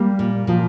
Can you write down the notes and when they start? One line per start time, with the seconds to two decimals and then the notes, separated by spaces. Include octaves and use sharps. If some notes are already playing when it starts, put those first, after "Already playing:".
Already playing: G3 A#3
0.19 A#2
0.47 A#2 F3